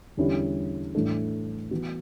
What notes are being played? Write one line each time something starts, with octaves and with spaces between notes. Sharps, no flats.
E2 D3 G3 C#4 E4
A2 E3 A3 D4 A4
E3 B3 F#4